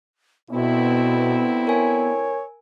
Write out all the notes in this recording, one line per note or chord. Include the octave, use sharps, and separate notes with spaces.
D2 B2 B3 C4 E4
A#4 C#5 G#5